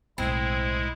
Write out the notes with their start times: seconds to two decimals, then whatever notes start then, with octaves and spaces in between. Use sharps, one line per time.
0.18 B1 A2 G#3 C4 E4